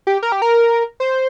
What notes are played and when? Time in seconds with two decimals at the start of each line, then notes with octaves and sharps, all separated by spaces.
0.07 G4
0.23 A#4
0.32 G4
0.42 A#4
1.00 C5